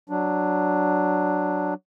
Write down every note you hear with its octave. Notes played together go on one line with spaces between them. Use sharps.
F#3 D4